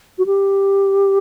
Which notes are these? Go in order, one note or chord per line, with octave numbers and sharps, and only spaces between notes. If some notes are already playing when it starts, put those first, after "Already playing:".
F#4
G4